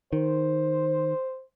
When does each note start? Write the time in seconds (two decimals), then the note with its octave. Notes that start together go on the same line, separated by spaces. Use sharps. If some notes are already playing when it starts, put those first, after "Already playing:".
0.13 D#3 C5